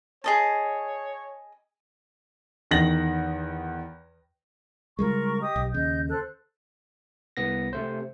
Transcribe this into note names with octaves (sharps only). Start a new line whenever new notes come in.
G#4 C#5 D#5 A5
E2 D#3 A#6 F#7
C#3 G3 G#3 F4 A#4 C#6
G4 D#5 D#6
B1
D#2 C#3 D#5 G6
A4 C5 F#6
C2 B3 A#6
C3 A3 C5